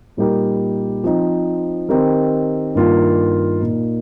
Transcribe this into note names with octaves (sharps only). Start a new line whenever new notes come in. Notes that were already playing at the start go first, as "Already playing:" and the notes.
A#2 G3 D#4 G4 A#4
F3 C4 D#4
D#3 C4 D#4 G4 A#4
G2 D#3 A#3 F4
A#2 A#3 D#4